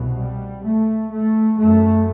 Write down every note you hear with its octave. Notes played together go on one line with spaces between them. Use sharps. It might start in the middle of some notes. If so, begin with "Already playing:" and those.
Already playing: C2 B2
G3
A3
A3
F#2 A3